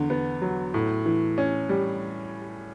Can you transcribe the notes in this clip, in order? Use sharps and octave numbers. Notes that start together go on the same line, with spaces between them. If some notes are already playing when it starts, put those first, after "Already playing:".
Already playing: E2 D3
B3
F#3
A2
E3
C#4
G3